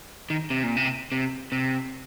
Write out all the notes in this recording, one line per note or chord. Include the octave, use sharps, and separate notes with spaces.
D#3
C3
A#2
C3
C3
C3